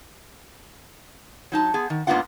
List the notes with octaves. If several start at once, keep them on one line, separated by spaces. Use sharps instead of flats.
F#3 D#4 A5
B3 G#4
D#3
G#2 A#3 B3 D4 F4 F#5